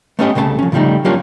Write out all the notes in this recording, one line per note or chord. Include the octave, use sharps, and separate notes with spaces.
A3 B3 C#4 E4 G4 D#5
C2 C#3 A3 C5 A5
F3 C#4
A2 C#3 F3 G3 A3 D#4
F#3 G3 A#3 C#4 D4 F4